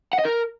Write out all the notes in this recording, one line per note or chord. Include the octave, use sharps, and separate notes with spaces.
F#5
D#5
A#4